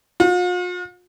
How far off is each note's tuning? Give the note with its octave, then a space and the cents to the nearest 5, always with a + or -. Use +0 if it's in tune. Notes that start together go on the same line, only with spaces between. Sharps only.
F4 +45